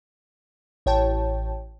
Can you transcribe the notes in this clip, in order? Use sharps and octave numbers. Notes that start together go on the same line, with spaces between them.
A1 C#5 G5 A5